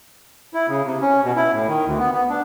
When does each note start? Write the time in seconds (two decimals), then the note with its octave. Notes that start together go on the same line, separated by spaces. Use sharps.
0.54 E4
0.68 C#3
0.85 C3
1.02 C#4
1.24 B2
1.36 E4
1.53 A2
1.68 D#3
1.86 D2
1.99 B3
2.13 B3
2.30 D4